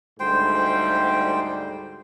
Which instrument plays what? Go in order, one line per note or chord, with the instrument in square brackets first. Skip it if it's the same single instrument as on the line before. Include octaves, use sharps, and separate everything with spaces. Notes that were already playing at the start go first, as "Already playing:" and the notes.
[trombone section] D2 G#2 G3 [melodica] C5 G5